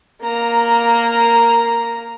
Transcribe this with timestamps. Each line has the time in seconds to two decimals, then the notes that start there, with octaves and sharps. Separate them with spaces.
0.22 A#3 A#5